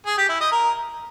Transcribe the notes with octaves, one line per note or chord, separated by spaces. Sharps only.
G#4
G4
E4
D#5
A#4